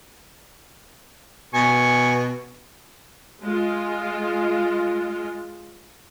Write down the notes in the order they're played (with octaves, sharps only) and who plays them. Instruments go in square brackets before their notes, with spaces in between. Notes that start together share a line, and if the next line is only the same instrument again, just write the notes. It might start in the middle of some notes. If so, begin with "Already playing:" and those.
[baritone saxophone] B2 [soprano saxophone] G#5 [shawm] C#6
[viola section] G#3 F4